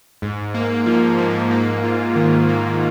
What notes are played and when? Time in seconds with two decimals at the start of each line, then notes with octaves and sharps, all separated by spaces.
0.22 G#2
0.54 A#3
0.86 F3
1.18 G#2
1.51 A#3
1.84 F4
2.16 D#3
2.49 A#3